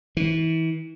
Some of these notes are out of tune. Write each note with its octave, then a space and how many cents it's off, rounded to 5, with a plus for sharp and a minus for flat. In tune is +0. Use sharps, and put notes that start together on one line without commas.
E3 -30